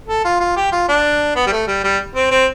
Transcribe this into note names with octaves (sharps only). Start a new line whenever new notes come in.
A4
F4
F4
G4
F4
D4
B3
G3
A3
G3
G3
C4
C4